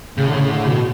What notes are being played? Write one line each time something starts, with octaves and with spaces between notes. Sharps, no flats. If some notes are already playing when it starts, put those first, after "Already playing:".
A2 C#3
D3
C#3
D3
B2